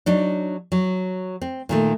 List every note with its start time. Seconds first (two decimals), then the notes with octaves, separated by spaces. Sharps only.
0.06 F#3 D4 D#4
0.72 F#3
1.42 C4
1.69 A#2 D#3 A3